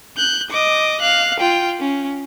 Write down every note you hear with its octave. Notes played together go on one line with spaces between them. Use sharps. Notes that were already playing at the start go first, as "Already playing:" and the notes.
F#6 G6
D#5 D6
F5 F#6
F4 G5
C#4